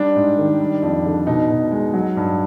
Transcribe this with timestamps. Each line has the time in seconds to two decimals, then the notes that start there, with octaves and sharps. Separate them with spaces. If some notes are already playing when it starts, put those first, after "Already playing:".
Already playing: G3 D4
0.16 G#2
0.38 D#3
0.60 G3
0.82 F2
1.05 D3
1.26 B2 D#4
1.50 B2
1.71 G#3
1.93 F#3
2.17 G2